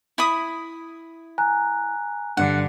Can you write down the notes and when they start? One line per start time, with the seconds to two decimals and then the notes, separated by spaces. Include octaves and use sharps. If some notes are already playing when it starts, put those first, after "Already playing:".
0.18 E4 B5 D#6
1.38 G#5 A#5 F#6
2.37 G2 D3 D4 F#5